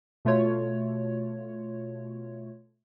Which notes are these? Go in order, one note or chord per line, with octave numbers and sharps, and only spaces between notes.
B2 A3 F4 C#5